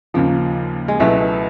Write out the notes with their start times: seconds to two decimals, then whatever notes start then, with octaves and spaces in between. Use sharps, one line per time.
0.14 D#2 C#3 F3 A#3
0.88 G#3
1.00 C#2 B2 F#3 A3 B3 E4